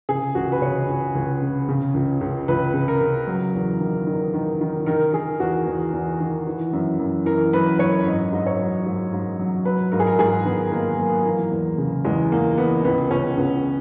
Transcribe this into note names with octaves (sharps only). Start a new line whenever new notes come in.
C#3 G#4
C#2 F#4
B4
C#3 C#5
C#2
C#2
C#3
C#3
C#2
C#2
C#2 B4
C#3
A#4
C#3
F#3
E2
D#3
D#3
D#3
D#3
D#3 A#4
D#3 G#4
E2 F#4
E2
E2
D#3
E3
F#2
F#2
E3 A#4
F#2 B4
F#2 C#5
G#2 D#5
G#2 D#5
C#5
F#3
G#2
G#2
F#3
F#3 B4
G#2 A#4
G#4
A#4
G#2 G#4
D#3 B3
D#3 A#3
F#3 A#3
E3 A#3
E2
C#3
E2 G#3
E2 A#3
E3 B3
C#2 B3
C#2 C#4
C#2 B3